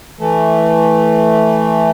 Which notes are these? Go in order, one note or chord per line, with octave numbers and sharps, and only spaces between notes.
E3 A3